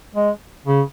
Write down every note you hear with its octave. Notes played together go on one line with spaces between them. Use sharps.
G#3
C#3